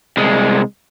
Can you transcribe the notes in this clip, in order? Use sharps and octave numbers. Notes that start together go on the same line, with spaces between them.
C2 G#3